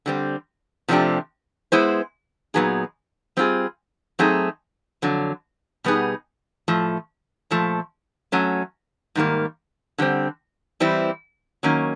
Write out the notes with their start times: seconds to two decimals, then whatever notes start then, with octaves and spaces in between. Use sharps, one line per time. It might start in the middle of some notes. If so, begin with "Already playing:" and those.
0.06 D3 G3 C4
0.88 C3 F3 A3 D4 G4
1.72 G#3 B3 E4 G#4 C5
2.54 A#2 F#3 B3 D#4 G#4
3.37 G3 C4 F4 G#4
4.19 F#3 A3 C4 D#4 G#4
5.02 F2 D3 F#3
5.84 B2 G3 B3 D#4 G#4
6.68 A2 F3 A3
7.51 A#2 F3 A3
8.32 F#3 A3 C#4
9.15 G#2 D#3 G3 A#3
9.98 D3 G3 C4
10.80 E3 G3 C4 E4
11.63 D#3 F#3 A#3 C#4